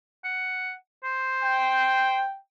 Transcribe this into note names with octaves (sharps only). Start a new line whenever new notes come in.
F#5
C5
G5